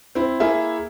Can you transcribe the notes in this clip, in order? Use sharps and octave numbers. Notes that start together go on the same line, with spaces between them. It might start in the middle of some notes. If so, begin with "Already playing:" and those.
C4 E4
A#3 E4 G#4 E5